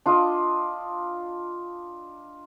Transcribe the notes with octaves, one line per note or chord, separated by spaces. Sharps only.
D4 F4 D5 D#5